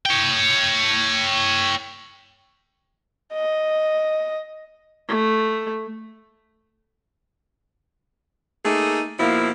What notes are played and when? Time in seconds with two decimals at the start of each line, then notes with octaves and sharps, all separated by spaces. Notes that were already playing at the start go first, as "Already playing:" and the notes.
0.06 C#5 G5
3.33 D#5
5.09 A3
8.65 A3 A#3 D#4 G#4
9.19 B2 F3 A#3 E4